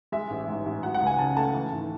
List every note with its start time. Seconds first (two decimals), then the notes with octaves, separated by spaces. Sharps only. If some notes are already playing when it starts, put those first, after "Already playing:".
0.12 G#3 E5
0.30 A1
0.48 G#2
0.65 A1
0.83 F#3 F#5
0.94 F#5
1.01 C#2
1.07 G#5
1.18 C#3 A5
1.36 A3 A5
1.54 E3
1.72 G#1